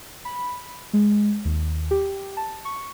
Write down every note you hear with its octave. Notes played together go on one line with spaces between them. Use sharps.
B5
G#3
D#2
G4
A5
C#6